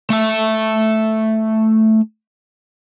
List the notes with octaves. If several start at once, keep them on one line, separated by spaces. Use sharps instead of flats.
A3 E5